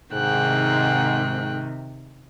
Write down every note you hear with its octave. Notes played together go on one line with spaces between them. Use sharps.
G#2 C3 D#3 G5 F#6